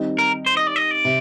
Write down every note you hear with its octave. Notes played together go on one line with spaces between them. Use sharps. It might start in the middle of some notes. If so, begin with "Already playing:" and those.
Already playing: D#3 G3 C4 D#4
A#4
C5
D#5
D5
D#5
D5
C3